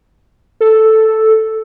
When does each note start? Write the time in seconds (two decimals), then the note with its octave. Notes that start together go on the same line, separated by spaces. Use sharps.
0.61 A4